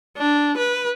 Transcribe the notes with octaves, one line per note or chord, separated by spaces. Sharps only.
D4
B4